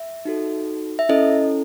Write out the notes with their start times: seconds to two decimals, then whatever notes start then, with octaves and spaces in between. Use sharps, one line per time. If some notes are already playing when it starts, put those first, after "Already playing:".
Already playing: E5
0.25 D#4 F#4 A4
0.99 E5
1.09 C#4 E4 A4 D#5